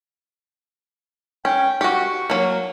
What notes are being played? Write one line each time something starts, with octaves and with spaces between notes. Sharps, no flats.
C#4 G5
F#4 G4 C#6
F#3 A#3